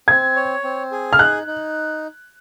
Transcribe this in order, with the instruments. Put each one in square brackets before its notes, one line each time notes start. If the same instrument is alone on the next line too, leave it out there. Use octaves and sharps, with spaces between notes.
[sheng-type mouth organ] C4 [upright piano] G#6
[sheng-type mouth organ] C#5
C4
G#4
[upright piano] F6
[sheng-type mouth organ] D#4 [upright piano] F#6
[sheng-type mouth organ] D#4